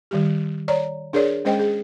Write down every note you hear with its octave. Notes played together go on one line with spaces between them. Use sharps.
D#3 G3 G4
C#5 D5 A#5
D4 G#4 A#4 C#5 D5
G#3 C#4 G#4 C5 D#5 G5
G#4